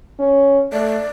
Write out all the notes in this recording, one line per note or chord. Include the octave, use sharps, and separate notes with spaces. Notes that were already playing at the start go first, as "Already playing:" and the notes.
C#4
A3 D5